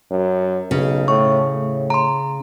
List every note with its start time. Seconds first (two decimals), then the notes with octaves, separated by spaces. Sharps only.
0.11 F#2
0.71 B1 C#3
1.08 A2 C#6
1.52 A2
1.90 A#5 C6